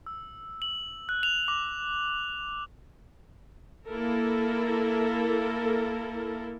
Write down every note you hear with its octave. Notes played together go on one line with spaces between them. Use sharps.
E6
F#7
F#6
F7
D6
A#3 E4 A4 A#4